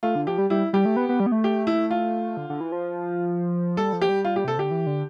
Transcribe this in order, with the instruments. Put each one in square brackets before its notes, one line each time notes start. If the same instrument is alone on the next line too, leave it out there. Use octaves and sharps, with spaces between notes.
[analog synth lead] A3 [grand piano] F4
[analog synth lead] D3
[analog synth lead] F3 [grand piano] G4
[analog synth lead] G3
[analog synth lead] G3 [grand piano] E4
[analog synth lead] G3 [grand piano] G4
[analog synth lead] A3
B3
B3
G3
B3
A3
[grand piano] G4
E4
F4
[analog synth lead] D3
D3
E3
F3
[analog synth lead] G3 [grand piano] A4
[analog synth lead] F3
[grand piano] G4
[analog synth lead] G3
[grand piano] F4
G4
[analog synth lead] C3 [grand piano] A4
[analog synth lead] D3 [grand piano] G4
[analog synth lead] E3
D3